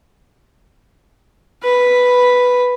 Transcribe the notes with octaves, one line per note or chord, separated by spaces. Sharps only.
B4 B5